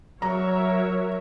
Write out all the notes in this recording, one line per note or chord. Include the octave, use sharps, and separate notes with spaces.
F#3 A#4 C#5 E5 A#5